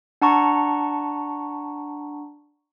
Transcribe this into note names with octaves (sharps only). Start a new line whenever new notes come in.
D4 F#5 A5 A#5 C#6